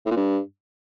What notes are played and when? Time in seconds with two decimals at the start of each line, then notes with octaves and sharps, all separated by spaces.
0.06 A2
0.11 A#2
0.16 G2